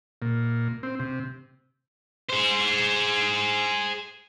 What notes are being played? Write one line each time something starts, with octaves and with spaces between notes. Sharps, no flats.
A#2
C4
C3
G#4 C5